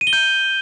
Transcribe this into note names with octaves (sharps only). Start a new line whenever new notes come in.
D#7
G7
G6